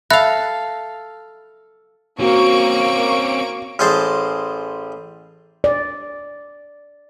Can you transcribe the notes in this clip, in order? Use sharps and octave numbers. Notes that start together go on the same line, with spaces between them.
A4 E5 F5 B5 F#6
A#3 C4 C#4 F#4 C#6 D7
A1 G#4 C5 D#5 A5
D5